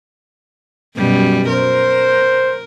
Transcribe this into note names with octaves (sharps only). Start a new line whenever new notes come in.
F#2 B2 G3
A#4 C5